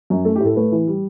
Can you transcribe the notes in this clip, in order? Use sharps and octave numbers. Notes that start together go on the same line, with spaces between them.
F#2
A3 A4
G4
A2
A4
A3 B4
E3
G3